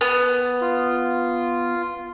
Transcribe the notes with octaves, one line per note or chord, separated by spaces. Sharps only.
B3
F4